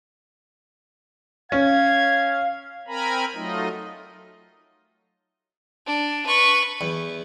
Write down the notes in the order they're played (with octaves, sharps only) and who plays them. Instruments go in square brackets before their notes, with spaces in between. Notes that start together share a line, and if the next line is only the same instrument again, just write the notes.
[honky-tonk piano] C#4 [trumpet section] F5 [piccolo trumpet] G#6
[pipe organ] C4 A#4 G#5 A#5 B5
F#3 A3 D#4 F4 D#5
[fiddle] D4
B4 C#6
[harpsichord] E2